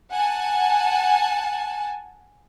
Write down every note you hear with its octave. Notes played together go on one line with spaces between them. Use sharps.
F#5 G#5 A5